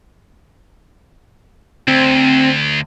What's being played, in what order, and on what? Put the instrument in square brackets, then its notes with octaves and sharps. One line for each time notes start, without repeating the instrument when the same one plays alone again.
[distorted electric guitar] D2 [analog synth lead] C4